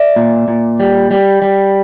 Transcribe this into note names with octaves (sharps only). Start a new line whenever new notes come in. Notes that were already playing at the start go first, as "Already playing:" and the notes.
Already playing: D5 E5
A#2
A#2
G3
G3
G3